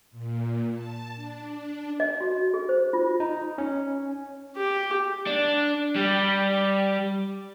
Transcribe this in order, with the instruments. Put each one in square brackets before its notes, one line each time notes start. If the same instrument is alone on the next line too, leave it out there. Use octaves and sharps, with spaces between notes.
[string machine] A#2
A5
D4
D4
[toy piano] D#5
F#4
G#4
C5
F4
[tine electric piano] D#4
C#4
[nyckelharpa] G4
[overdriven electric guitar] D4
G3